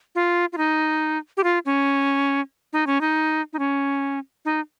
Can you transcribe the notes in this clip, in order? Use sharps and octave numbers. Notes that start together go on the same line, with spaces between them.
F4
F4
D#4
G4
F4
C#4
D#4
C#4
D#4
D#4
C#4
D#4